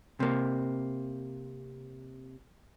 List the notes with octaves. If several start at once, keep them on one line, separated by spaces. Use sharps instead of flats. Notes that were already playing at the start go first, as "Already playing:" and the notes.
C3 A#3